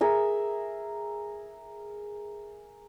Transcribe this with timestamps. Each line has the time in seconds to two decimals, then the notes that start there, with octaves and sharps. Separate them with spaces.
0.01 G#4 A#4 E5